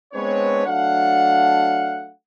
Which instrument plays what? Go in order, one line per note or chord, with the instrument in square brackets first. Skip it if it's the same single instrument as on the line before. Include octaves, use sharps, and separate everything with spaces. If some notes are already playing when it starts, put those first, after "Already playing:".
[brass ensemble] G#3 B3 C4 D4 B4 C#5
F#3 A3 D4 F5 F#5